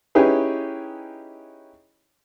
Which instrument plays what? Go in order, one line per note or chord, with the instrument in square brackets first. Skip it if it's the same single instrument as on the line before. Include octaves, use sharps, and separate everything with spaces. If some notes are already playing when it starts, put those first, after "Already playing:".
[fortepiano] C#4 D#4 E4 G4 G#4 B4